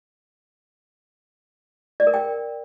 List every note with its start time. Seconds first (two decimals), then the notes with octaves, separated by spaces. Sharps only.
2.00 D5
2.07 A#4
2.14 G5